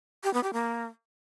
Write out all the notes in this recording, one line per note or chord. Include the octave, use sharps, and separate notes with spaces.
G4
B3
G4
A#3